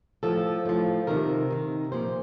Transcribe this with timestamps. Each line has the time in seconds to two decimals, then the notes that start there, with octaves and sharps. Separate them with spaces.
0.23 A2 F3 A4
0.66 A2 F3
1.07 C3 D#3 A#4
1.51 C3 D#3
1.92 A#2 F3 C5